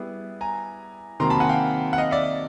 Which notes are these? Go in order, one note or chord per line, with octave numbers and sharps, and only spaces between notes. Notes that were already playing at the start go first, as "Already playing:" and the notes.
Already playing: G3 B3 E4 G#4
G#5 A#5
C3 D#3 F#3 A#3 A#5 C6
A5 B5
F#5 G#5
F5 G5
F#5
D#5 F5
D5 E5